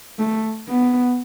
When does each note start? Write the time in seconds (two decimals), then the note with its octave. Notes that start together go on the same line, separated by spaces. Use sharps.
0.19 A3
0.69 B3